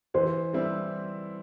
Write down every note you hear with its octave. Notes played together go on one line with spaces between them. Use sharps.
E3 C5
G3 C4 E4